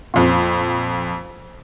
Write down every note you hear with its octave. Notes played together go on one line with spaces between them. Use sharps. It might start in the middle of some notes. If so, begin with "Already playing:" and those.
F2 A#2